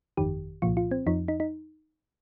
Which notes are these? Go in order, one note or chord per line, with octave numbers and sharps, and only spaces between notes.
G1 F2 D#3 G4
C2 A#2 F3 F4
F4
C4
F2 F3 D#4
D#4
D#4